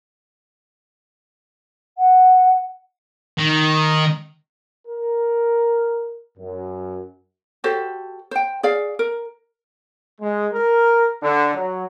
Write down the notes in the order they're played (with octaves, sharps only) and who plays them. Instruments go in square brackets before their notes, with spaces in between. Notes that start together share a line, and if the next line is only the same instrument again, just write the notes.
[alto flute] F#5
[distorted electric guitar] D#3
[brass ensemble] A#4
F#2
[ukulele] F#4 G4 A4 C5
C5 G5
G#4 D5 F5
A#4
[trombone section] G#3
A#4
D3
F#3